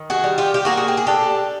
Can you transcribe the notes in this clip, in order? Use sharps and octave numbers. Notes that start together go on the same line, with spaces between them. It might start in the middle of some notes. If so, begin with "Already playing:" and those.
Already playing: D#3
F#4 G#4
G3
F4 G4
G4
A#3 F#4 G#4
F#4
G4
G#4
D4 G4 A4